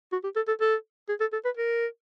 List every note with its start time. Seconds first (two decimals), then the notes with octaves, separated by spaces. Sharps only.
0.12 F#4
0.24 G4
0.36 A4
0.48 A4
0.60 A4
1.09 G#4
1.20 A4
1.33 A4
1.45 B4
1.57 A#4